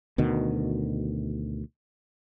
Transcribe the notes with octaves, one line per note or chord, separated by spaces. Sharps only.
D2 B2 D#3